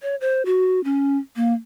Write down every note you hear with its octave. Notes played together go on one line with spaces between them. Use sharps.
C#5
C5
F#4
C#4
A#3